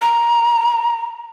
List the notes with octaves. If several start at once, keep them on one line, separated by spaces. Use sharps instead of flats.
A#5